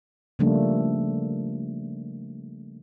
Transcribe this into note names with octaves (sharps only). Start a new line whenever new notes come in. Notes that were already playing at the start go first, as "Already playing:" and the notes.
C#3 F3 G3 A3 A#3 D4